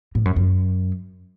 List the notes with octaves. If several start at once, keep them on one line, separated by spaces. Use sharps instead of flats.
A2
F#2
F#2